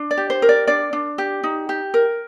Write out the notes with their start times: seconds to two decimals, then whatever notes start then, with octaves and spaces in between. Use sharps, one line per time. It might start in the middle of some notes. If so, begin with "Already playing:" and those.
Already playing: D4
0.11 D5
0.17 G4
0.30 C5
0.42 A#4
0.49 D5
0.67 D4 D5
0.93 D4
1.18 G4
1.44 D#4
1.69 G4
1.94 A#4